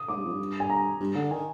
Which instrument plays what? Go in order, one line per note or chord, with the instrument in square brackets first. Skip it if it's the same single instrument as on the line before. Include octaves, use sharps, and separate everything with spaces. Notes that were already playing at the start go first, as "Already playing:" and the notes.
Already playing: [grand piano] D#6
[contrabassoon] G#2 [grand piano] D6
[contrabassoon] G2
F2
G2
[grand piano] G#5
A#5
[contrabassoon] G2
D3
[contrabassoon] D#3 [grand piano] G#5